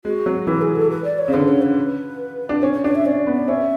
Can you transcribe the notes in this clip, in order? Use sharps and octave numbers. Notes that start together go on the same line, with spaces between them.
G#3 F#4
F#3
E3 B4
G#4
A4
B4
D5
C#5
C#3
D3 B4
C#5
B4
D4
C#4 C#5
C#5
D4 C#5
E5
C#4 D5
B3
D5
C#4 E5